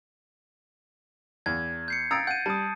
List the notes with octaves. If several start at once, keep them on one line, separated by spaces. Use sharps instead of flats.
E2 G#6
G6 C7 C#7
A#5 D#6 E6 G#6 A6 D7
F#5 G6 D#7
G3 A5 D#6